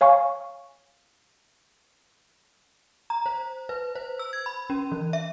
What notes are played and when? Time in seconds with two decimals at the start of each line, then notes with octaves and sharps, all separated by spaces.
0.01 C#5 F5 G#5 C#6
3.10 A#5
3.26 C5
3.69 B4
3.95 C5
4.19 E6
4.33 G#6
4.46 B5
4.70 C#4
4.92 E3
5.13 E5